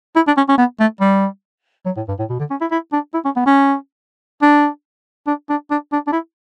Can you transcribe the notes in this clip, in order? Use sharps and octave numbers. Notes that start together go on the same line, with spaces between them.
E4
D4
C#4
C#4
B3
A3
G3
F#3
A2
G2
A2
B2
D3
C#4
E4
E4
D4
E4
C#4
B3
C#4
D4
D4
D4
D4
D4
D4
E4